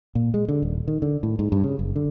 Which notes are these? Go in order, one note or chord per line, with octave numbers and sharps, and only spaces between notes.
A#2
G#3
D3
D#1
D#3
D3
A2
G#2
G2
C#3
F#1
D3